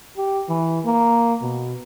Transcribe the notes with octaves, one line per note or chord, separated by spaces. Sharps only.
G4
E3
A#3
B2